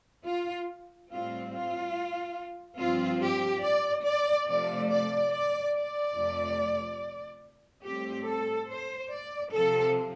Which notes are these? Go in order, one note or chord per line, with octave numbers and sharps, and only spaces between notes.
F4
A2 G3 C4 F4
F4
G2 F3 C4 F4
G4
D5
D5
C3 F3 A3 D5
D5
D5
D5
F2 C3 A3
A2 G3 C4 G4
A4
C5
D5
C3 F3 C4 A4